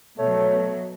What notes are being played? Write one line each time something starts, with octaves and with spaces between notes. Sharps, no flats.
B2 F#3 A3 C#5